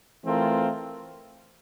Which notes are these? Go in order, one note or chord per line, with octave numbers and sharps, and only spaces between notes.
E3 A3 C4 F4 A#4